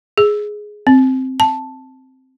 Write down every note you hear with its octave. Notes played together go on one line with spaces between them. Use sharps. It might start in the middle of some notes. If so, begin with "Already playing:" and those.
G#4
C4
A5